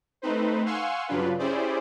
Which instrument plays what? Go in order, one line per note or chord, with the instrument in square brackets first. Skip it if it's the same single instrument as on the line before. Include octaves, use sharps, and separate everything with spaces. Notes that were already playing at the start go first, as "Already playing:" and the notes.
[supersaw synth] A3 C4 D#4 B4 C5
F5 F#5 G#5 C6 C#6 E6
G2 C#3 F#3 D4 F4 B4
C#4 E4 G4 G#4 C5 D5